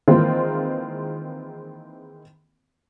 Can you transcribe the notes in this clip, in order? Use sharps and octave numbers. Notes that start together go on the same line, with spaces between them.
D#3 E3 G#3 A#3 C4 F4